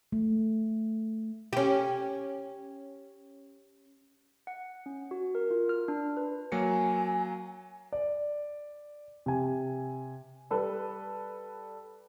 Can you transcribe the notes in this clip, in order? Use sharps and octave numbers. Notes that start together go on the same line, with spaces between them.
A3
C#4 G4
F#5
C#4
F#4
A#4
F4
F6
D4
B4
F#3 A#3 G#5 C#7
D5
C3 G#5
G3 A4 B4